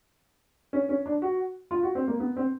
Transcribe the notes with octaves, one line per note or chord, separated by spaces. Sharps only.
C#4
C#4
D4
F#4
F4
F#4
C4
A#3
B3
C4